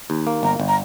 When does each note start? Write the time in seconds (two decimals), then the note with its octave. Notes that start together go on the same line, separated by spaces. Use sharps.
0.10 D#2
0.27 A#3
0.43 G1 A#5
0.60 G1
0.68 A#5